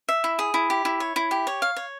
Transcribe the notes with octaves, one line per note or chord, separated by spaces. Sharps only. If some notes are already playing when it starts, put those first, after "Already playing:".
E5
E4
G#4
E4
G4
E4
C#5
E4
G4
C#5
F5
C#5